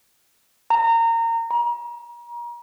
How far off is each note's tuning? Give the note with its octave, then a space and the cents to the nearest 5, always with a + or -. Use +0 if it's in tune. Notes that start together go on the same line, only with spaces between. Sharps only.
A#5 -25
A#5 +35